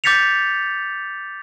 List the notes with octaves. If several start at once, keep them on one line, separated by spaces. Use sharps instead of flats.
D6 G6 A6 B6 C#7 F7